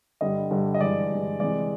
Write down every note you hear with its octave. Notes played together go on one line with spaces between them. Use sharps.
G2 D3 G3 D#5
G2 D3 G3
D#5
G2 E3 G#3 D5
G2 E3 G#3
C3 E3 G#3 D5